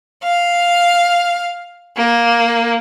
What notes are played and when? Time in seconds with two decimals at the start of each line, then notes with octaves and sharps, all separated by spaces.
0.23 F5
1.97 A#3